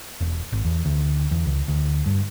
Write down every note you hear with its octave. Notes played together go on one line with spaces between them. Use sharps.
E1
G#1
E2
D2
E2
C#2
D2
G2